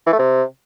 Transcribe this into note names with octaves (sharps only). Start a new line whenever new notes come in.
E3
A3
C3